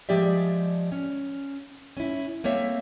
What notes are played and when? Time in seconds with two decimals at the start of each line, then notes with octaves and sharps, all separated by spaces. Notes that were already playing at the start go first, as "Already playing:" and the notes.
0.09 F3 G#3 G4 D5 E5
0.92 C#4
1.97 C#4 E4
2.44 A3 A#3 C4 C#5 E5